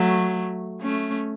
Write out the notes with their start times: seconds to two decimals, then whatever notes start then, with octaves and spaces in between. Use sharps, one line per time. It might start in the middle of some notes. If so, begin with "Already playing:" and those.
Already playing: F#3 A3
0.81 A3 C#4